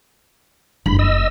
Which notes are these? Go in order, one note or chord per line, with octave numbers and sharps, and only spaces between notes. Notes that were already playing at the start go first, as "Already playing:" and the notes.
F#1 G2 B5
D#5 E6